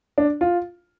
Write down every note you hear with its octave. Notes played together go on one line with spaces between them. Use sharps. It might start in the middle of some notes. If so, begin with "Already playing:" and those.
D4
F4